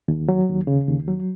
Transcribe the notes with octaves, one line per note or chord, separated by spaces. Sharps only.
D#2
F#3
D#2
C#3
D#2
F#3